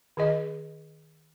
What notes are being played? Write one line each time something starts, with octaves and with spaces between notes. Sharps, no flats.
D#3 G#4 D#5